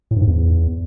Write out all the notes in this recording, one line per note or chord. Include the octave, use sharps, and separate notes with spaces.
A2
G2
G#2
E2